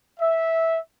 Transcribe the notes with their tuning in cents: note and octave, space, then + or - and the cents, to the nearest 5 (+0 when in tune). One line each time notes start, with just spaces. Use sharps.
E5 -10